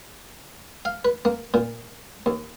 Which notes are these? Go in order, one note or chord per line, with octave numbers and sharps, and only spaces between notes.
F5
B4
A#3
A#2
D#2